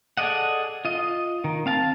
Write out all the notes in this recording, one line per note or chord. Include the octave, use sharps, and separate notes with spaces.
G#4 A4 D5 D#5 F#5
F4 D#5
D#3
C4 F5 A5